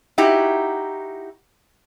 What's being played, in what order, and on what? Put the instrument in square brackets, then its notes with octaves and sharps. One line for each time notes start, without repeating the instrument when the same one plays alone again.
[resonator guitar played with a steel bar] D#4 E4 F#4 G4